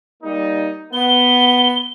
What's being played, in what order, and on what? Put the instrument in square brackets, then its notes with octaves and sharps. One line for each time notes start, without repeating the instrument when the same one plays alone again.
[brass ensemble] G3 A#3 D#4
[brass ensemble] B3 [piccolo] G7